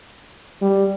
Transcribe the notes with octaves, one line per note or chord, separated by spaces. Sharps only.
G3